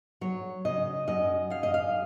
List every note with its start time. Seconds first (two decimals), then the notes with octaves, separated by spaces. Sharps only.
0.21 F#3 C#5
0.65 C#3 D#5
1.07 F#2 D#5
1.50 F#2 F5
1.63 D#5
1.74 F5